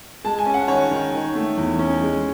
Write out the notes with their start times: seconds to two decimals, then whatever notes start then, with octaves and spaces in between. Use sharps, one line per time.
0.24 G#3 A5
0.39 G#5
0.46 C#4
0.54 F#5
0.68 D#3 C#5
0.91 D#3
1.13 D#3
1.35 A3
1.57 E2
1.79 C#4
2.01 G#3